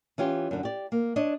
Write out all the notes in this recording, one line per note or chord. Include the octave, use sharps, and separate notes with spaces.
E3 C#4 F4 G4
F#2 D3
G4 D5
A#3
D4 C#5 D#5